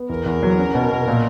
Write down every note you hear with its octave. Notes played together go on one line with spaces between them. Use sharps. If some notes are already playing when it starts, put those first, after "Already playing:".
Already playing: B3
E2 A#4
E2
F#3
C#4
B2
B2
A#2